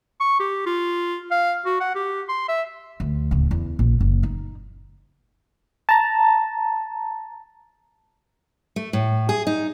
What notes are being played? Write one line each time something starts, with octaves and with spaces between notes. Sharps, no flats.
C#6
G4
F4
F5
F#4
F#5
G4
C6
E5
D2
D1 C#3
E2
A#1
F#1
D#4
A5 A#5
A3
A2
G#4
D#4